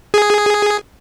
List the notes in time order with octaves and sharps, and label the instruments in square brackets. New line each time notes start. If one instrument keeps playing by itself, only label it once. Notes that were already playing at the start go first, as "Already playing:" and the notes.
[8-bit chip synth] G#4